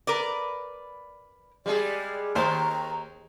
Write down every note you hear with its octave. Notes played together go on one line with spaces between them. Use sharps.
A#4 B4 D5
G3 G#3 G#4 D5
D#2 D#3 C5 A#5